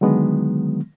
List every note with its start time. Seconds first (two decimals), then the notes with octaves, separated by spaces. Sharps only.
0.01 D3 D#3 F#3 G#3 B3